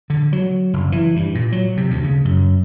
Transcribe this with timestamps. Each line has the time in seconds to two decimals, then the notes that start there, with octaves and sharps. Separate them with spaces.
0.10 D3
0.33 F#3
0.73 F#1
0.92 E3
1.16 G2
1.35 A#2
1.52 F#3
1.77 C3
1.91 D2
2.04 C#3
2.25 F#2